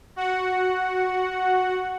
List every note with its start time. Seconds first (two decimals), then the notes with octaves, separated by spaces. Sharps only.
0.16 F#4 F#5